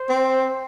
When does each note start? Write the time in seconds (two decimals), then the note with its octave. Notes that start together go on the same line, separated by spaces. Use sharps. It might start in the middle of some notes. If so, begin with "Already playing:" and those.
Already playing: C5
0.09 C4